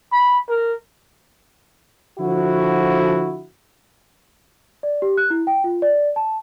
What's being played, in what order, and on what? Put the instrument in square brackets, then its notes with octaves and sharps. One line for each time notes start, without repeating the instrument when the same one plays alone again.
[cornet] B5
A#4
[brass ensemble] D3 F3 E4 F#4
[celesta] D5
G4
F#6
E4
G5
F4
D5
A5